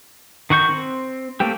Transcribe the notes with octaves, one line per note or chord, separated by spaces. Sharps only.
D#3 F#4 C#6 G6
C4
A3 A#3 C4 G4